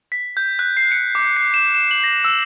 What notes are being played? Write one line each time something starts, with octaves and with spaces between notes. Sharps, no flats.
B6
G6
F#6
C7
C#7
D6
C7
E7
E7
F#7
A#6
E6